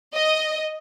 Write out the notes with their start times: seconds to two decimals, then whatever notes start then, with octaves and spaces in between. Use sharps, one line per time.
0.15 D#5